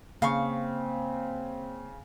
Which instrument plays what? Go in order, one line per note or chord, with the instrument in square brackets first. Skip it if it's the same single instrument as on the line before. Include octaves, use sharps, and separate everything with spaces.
[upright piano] C#3 [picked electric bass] A#3 [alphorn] C4 [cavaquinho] F5 C#6